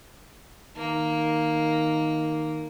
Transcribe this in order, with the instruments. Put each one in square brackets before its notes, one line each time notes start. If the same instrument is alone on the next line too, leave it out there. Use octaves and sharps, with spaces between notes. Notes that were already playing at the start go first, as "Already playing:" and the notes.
[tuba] D#3 [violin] A#3